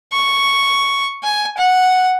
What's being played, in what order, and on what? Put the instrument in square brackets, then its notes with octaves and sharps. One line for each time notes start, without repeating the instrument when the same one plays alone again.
[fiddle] C#6
G#5
F#5